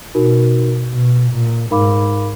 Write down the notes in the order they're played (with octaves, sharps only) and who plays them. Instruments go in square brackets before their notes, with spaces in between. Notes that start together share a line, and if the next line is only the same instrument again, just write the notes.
[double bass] B2 [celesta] D#4 F#4 A#4
[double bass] B2
A#2
[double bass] G#2 [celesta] D#4 A#4 F5 B5 D6